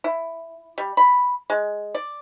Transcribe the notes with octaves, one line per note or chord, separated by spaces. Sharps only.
E4
G3
B5
G#3
D5